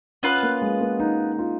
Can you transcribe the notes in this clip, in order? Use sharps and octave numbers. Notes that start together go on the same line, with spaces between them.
B3 C#4 F4 B4
A#3
G#3
A#3
D#4
F4